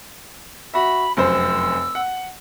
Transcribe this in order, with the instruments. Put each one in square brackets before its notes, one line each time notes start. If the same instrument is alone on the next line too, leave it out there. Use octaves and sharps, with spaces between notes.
[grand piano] F#4 E5 [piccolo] B5
[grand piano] F1 F#2 C5 [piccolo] E6
[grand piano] F#5